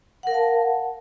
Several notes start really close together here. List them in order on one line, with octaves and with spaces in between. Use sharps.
F#5 A#4 F5 A5